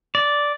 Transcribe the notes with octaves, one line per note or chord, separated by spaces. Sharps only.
D5